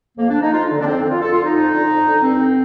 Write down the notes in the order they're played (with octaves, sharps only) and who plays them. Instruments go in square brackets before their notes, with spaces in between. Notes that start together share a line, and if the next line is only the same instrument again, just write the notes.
[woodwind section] F2 A#3
D4
D3
D#4
F2 F4
D3
D4
F2 C4
D3
F4
F2 A4
F4
D3
D#4
F2
D3
F2
D3
G2 C4
D3